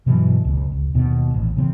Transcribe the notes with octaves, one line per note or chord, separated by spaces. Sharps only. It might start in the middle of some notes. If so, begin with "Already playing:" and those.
G2 B2 E3 F#3
F#1 C#2
C#2
D#2 B2
A1
C#3 E3 A#3 C4